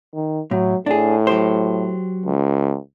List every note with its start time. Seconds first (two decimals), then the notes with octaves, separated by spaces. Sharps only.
0.14 D#3
0.51 A2 F#3
0.86 A2 D4 G#4
1.27 F#3 G4 C5
2.26 C#2